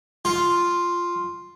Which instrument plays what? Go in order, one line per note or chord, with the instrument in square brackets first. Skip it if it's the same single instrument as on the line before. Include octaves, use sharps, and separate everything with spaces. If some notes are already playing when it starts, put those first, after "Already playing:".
[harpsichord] F4